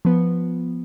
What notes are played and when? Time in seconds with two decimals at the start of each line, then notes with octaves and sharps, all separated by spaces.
0.05 F3 B3